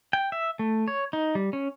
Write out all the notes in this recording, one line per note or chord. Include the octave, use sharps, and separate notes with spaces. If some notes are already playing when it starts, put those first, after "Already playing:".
G5
E5
A3
C#5
D#4
G3
C#4